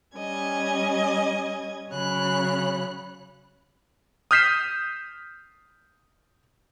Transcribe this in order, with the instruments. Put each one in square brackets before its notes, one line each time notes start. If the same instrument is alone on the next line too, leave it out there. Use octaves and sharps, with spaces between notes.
[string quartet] G3 C#4 D#5 G#6
C#3 F#3 C#5 B5 F#6
[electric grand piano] D#6 F6 G6 B6 C7 E7